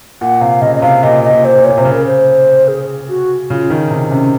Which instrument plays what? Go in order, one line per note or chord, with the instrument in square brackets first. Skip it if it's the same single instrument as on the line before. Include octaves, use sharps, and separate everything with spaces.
[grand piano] A#2 [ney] F#5
[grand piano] C3 [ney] F5
[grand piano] C#3 [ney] D#5
[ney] D#5
[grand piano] C3 [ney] F5
[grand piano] A#2 [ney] D#5
[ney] D#5
[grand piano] A#2
[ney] C5
[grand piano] A#2
[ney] C#5
[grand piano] A#2
[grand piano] C3 [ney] C5
[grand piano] C#3
[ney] A#4
C5
G#4
F#4
[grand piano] C#3 [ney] F4
[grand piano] D#3 [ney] D#4
[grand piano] C3
[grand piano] C3 [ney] C#4